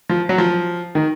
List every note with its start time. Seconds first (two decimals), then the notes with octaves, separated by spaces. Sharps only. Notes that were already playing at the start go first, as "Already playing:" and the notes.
0.09 F3
0.29 F#3
0.38 F3
0.95 D#3